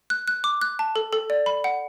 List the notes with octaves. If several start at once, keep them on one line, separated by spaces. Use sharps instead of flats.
F#6
F#6
D6
F#6
A5
A4
A4
D5
B5
F#5